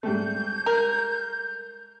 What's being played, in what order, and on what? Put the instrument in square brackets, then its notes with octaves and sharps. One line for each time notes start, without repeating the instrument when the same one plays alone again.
[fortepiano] G#2 G3 A3 [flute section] G6
[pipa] A#4